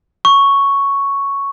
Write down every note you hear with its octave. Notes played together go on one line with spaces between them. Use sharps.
C#6